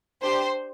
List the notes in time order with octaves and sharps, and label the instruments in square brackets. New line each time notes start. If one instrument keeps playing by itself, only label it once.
[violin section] D4 G4 C5